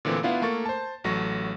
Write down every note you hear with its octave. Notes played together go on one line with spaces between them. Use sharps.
A#2 D3 E3 A3 C4
B3 D4 E4 F4 F5 F#5
A3 A#3 C#6 A6
C5 A5
A1 F#3 A3 C#6 A#6